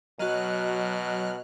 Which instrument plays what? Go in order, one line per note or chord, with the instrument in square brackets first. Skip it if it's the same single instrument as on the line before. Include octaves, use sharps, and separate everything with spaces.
[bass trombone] B2 [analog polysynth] F#3 F6 F#6 [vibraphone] F#4 D#5